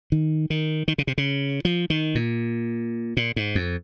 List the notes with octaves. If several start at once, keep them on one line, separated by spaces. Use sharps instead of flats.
D#3
D#3
D#3
C#3
C3
C#3
F3
D#3
A#2
A#2
G#2
F2